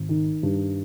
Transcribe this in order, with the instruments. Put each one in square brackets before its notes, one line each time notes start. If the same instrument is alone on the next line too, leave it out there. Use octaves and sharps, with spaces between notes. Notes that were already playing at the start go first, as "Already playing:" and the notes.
Already playing: [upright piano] G#1
D#3
G2